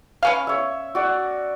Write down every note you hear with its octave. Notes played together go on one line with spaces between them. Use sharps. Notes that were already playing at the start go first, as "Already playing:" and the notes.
B3 C#4 F5
C#5 E5
F#4 D5